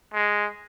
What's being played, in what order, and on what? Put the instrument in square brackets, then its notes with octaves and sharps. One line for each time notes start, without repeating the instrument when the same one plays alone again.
[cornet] G#3